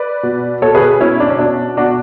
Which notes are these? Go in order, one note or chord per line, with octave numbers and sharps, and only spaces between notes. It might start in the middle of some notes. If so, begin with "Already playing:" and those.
Already playing: B4 D5
B2
B2 A4 C#5
G#4 B4
B2 C#4 E4
D4
C#4
B2 D4
B2 D4 F#4